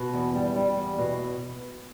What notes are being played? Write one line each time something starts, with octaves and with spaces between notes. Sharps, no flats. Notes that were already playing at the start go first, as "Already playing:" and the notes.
Already playing: B2
E2
G3
G3
E2
B2